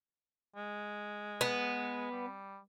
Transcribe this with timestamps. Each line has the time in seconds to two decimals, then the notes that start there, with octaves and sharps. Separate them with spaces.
0.56 G#3
1.41 B3
2.11 G3